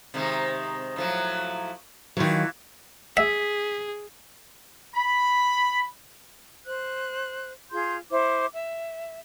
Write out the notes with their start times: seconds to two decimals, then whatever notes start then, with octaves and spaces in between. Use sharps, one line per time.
0.14 C3 D#3 G#3
0.96 A2 F3 F#3
2.17 D#3 E3 F#3 F4 F#4
3.17 G#4 E5 B6
4.95 B5
6.66 C5 F#6
7.71 F4 G#4 C6 G6
8.11 E4 C5 D6
8.53 E5